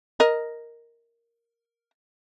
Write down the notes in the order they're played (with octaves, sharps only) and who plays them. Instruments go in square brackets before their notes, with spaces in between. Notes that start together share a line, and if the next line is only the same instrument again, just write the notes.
[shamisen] A#4 D#5